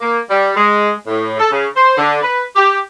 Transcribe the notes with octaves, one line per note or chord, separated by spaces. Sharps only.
A#3
G3
G#3
A2
A4
C#3
C5
D3
B4
G4